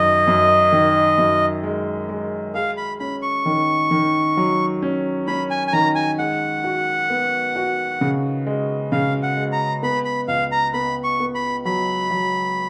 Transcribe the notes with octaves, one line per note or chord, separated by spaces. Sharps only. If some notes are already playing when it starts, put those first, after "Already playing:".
Already playing: F#2 D#3 D#5
F#2
D#3
F#2
G#3
G#3
G#4 F5
B5
C#4 B5
C#6
D#3
D#3
F#3
C#4
C#4 B5
G#5
G#5
D#3 A#5
G#5
G#3 F#5
F#4
B3
F#4
C#3
G#3
C#3 F5
F#5
G#3
A#5
B3 B5
B5
C#2 F5
A#5
B3 B5
C#6
B3
B5
F#3 B5
F#3